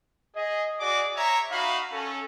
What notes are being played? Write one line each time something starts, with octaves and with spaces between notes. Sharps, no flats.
G#4 D#5
F#4 G#4 D5 D6
C#5 E5 A#5
D#4 F#4 F5 B5
C#4 A4